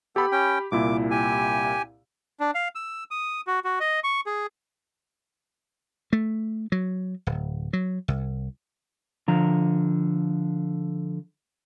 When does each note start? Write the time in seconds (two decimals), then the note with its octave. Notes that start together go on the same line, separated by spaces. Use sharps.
0.16 B3 G4 A4 B5
0.32 C#4 G5
0.72 C2 A#2 E4 D6
1.11 G4 G#5
2.40 D4
2.55 F5
2.75 E6
3.11 D#6
3.47 F#4
3.64 F#4
3.80 D#5
4.04 C#6
4.26 G#4
6.13 A3
6.72 F#3
7.27 D1
7.73 F#3
8.08 C2
9.28 D3 F3 A#5